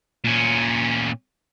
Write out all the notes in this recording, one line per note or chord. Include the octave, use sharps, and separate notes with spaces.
A#2 C#4